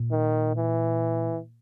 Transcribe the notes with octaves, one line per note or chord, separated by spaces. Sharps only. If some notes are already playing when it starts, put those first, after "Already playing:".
Already playing: A#2
D#3
E3